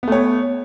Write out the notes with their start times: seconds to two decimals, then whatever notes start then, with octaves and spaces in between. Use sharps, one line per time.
0.03 B3
0.08 A3
0.12 C#5